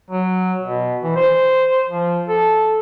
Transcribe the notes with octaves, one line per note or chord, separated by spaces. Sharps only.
F#3
B2
E3
C5
F3
A4